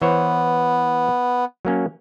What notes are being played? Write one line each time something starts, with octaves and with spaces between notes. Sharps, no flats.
E3 B3 C5 C#5
F#3 A#3 C#4